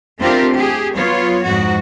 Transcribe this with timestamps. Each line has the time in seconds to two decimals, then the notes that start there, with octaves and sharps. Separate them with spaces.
0.20 A3 C4 D4 F4 G4 A#4
0.57 G4 G#4
0.96 F#3 B3 F4 C#5
1.44 F2 G#2 F#4